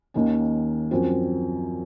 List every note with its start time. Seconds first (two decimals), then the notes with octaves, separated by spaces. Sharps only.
0.14 D#2 D#3 A#3 C#4
0.91 F#2 F3 C4